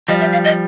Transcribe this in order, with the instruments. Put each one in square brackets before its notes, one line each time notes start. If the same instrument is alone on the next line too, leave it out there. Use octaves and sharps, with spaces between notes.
[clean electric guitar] F3 G3 [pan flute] D#5
[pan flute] E5
F5
D#5